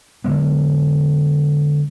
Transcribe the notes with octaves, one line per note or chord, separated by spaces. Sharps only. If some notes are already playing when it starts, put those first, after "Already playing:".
D3 F#3 G#3 B3